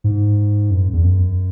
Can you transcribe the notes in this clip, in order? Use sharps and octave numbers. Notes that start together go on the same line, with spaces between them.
G#2
F#2
E2
F#2